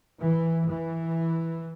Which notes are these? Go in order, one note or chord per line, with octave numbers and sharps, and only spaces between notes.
E3
E3